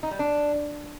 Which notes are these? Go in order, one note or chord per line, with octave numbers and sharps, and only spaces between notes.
D#4
G3
D4